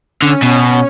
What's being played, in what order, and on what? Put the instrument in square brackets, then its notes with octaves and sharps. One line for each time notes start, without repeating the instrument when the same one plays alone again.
[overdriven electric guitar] D3 [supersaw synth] C#4
[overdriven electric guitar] B2